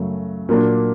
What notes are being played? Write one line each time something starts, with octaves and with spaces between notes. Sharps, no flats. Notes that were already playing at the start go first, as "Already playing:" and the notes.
Already playing: F#2 C#3 F#3 A3
A#2 F#3 A#3 D4